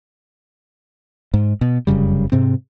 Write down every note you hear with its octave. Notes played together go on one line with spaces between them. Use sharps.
G#2
B2
F1 F#2 C#3 G3
G#2 C3 C4